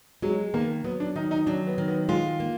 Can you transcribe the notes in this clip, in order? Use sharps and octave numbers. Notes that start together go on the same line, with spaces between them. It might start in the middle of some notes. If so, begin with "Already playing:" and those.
F#3 G#3
D#3 A#3
F#3 B3
D4
D#3 D#4
D#4
F#3 D4
B3
D#3
B3
G#3 F4
A#3